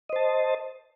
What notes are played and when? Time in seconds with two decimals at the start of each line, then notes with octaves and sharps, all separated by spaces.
0.09 D#5
0.13 C5
0.16 A5